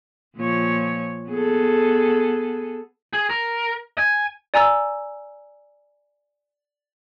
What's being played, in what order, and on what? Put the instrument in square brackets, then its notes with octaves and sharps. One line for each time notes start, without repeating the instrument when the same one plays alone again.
[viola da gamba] A#2 F3 C#5
B3 G#4 A4
[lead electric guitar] G#4
A#4
G#5
[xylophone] D5 G#5 A#5 E6